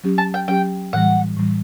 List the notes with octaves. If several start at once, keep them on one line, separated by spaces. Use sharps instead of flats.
F#3 C#4 G4
A5
G5
F#3 C#4 G4 G5
A2 E3 G3 F#5
A2 E3 G3